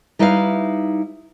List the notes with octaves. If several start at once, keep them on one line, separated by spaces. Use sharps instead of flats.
G3 D#4 E4 B4 E5 F5